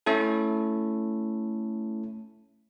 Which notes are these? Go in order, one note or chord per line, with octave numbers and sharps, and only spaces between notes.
A3 C#4 E4 A4